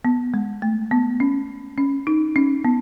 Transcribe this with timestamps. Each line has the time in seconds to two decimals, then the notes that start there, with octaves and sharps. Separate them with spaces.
0.05 B3
0.34 G#3
0.62 A3
0.91 B3
1.20 C#4
1.78 C#4
2.07 D#4
2.36 C#4
2.65 B3